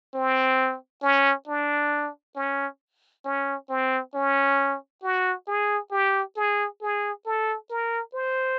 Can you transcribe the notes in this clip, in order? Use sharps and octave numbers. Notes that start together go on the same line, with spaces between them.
C4
C#4
D4
C#4
C#4
C4
C#4
F#4
G#4
G4
G#4
G#4
A4
A#4
C5